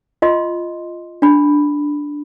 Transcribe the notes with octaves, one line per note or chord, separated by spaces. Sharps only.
F4 D#5 C6
D4 B5